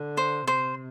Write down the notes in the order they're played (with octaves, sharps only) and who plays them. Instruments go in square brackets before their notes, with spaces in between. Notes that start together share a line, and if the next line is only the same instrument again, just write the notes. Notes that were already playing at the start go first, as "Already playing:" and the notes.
Already playing: [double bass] D3
[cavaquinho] C5
[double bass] C3 [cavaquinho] C5